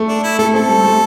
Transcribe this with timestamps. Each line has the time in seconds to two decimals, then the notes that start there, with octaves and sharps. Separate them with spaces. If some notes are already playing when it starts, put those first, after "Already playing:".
Already playing: A3
0.08 D4
0.24 E4
0.39 A3 A4
0.54 C4 A4
0.69 G3
0.84 A3